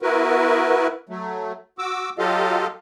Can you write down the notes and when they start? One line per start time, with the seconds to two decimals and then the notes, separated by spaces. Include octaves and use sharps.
0.02 B3 E4 F#4 A#4 B4
1.09 F#3 A3
1.78 F#4 D6 E6
2.18 F#3 F4 G4 A4 D#5 F5